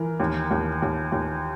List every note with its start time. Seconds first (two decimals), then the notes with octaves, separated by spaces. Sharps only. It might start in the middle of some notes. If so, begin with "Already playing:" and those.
Already playing: E3 A#4
0.20 D#2
0.51 D#2
0.82 D#2
1.12 D#2